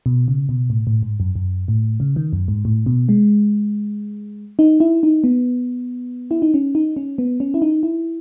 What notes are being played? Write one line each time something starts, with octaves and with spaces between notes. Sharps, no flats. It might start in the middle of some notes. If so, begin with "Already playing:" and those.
B2
C#3
B2
A2
A2
G#2
F#2
F#2
A2
C#3
D#3
F#2
G#2
A2
B2
G#3
D#4
E4
D#4
B3
E4
D#4
C#4
D#4
C#4
B3
C#4
E4
D#4
E4